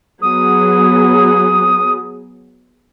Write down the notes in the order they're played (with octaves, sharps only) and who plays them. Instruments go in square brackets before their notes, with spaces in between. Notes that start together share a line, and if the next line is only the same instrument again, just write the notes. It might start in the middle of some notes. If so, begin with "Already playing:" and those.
[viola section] F#3 B3 G#4 [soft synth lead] D#6